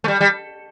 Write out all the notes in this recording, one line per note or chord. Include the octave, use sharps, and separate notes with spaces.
A3
G3
G3